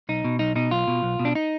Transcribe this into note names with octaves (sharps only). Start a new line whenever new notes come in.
B1 D#4
B2
B1 D#4
B2 D#4
B1 F4
B2
B1
B2
D4
D#4